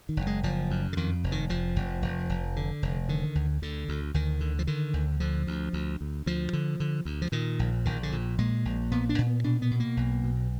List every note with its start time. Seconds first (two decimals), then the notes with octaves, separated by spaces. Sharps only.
0.09 D#3
0.17 F#1
0.27 G#3
0.43 F#1 F3
0.71 F#2
0.93 D3
0.97 F2 D#3
1.24 F1
1.32 D#3
1.49 F1 F3
1.76 F1
2.02 F1
2.29 F1
2.56 D3
2.82 F1
3.09 D3 D#3
3.35 D2
3.62 D2 D3
3.89 D2
4.14 D2 D#3
4.41 D3
4.59 F3
4.67 D3 D#3
4.93 D2
5.20 D3 F3
5.47 D2
5.73 D2
6.01 D2
6.26 D2 F3
6.53 D3
6.80 D3
7.05 D2
7.22 F3
7.32 A#2 D#3
7.59 A#1
7.85 A#1 D#3
8.03 D3
8.12 A#2
8.38 A#2 G#3
8.65 A#1
8.91 A#2 B3
9.09 D4
9.18 A#2
9.27 B3
9.44 B2 D4
9.62 B3
9.71 B2
9.80 A#3
9.97 B1
10.24 B2